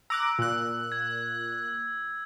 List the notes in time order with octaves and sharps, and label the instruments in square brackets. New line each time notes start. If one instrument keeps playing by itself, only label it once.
[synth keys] A#5 D6 F#6 [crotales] E6
[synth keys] A#2 F#6
[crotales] G#6